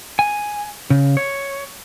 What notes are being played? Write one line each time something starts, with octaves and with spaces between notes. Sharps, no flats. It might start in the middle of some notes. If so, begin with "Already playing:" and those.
G#5
C#3
C#5